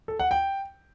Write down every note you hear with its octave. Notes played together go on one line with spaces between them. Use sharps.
A4
F#5
G5